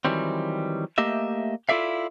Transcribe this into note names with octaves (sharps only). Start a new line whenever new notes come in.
D#3 E3 F#3 G3 C4
A3 A#3 G4 D#5 E5
E4 F4 A4 D5 E5 F5